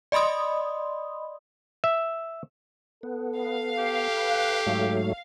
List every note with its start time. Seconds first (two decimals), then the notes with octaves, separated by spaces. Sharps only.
0.12 D5 D#5 B5 C6 D#6
1.84 E5
3.03 B3 A4
3.39 F5
3.79 G4
4.16 B4
4.66 G#2 F#3 A3